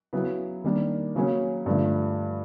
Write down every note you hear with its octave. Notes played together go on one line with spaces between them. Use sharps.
C#3 F#3 B3 E4
D#3 G3 A#3 D4
C#3 F#3 A#3 C#4
G2 D3 F3 A3